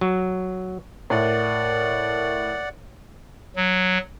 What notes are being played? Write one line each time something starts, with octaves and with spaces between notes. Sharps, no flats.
F#3
A2 A#4 D5 E5 F#5
F#3